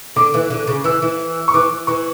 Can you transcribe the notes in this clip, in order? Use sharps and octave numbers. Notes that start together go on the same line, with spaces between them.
D3 D6
E3
D3
C#3
E3 E6
E3
C#6
E3 D6
E3 C#6